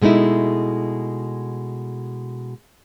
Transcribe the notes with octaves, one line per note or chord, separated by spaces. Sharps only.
B2 G#3 A3 D#4 E4